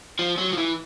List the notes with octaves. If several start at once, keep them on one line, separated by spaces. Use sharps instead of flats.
F3
F#3
F3
E3